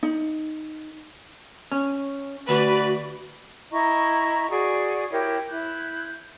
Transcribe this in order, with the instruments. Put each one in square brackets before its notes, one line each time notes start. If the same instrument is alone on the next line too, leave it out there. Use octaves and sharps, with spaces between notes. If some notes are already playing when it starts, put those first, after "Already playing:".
[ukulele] D#4
[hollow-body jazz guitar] C#4
[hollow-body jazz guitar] D2 [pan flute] F#4 [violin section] B4 D5
[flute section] E4 D#5 A#5 C#6
F#4 G#4 D5 C#6
E4 G4 A#4 C#5
E4 F#6 G6